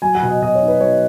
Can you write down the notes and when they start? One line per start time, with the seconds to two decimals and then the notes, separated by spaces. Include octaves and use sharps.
0.02 F#3 G#5
0.15 F#5
0.22 B2
0.28 D#5
0.41 B2 D#5
0.55 C#5
0.62 D#4
0.68 B4
0.80 F#3 C#5